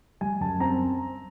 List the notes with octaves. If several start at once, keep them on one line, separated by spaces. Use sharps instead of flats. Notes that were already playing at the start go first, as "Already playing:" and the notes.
G3 G#5
F#2 A5
C4 A#5